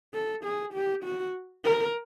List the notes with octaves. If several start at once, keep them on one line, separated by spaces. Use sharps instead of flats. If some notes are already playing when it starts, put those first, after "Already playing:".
A4
G#4
G4
F#4
A#4